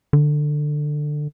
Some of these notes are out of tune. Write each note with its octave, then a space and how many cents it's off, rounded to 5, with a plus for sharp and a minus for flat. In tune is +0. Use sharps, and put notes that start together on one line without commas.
D3 +15